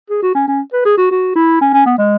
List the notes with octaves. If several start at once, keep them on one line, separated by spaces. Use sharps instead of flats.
G#4
F#4
C#4
C#4
B4
G#4
F#4
F#4
E4
C#4
C#4
B3
G#3